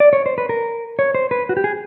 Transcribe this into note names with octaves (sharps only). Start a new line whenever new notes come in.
D5
C#5
C5
B4
A#4
C#5
C5
B4
F#4
G4
G#4